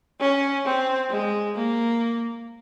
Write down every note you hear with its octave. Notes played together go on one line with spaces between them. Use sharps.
C#4
C4
G#3
A#3